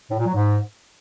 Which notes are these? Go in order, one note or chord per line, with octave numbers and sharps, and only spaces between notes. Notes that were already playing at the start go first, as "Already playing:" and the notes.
A2
A#2
F#3
G#2